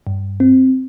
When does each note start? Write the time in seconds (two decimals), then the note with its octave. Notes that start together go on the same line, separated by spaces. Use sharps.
0.07 G2
0.40 C4